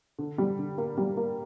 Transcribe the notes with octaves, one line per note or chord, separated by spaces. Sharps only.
D3
G3
D3
A#3
G3
A#3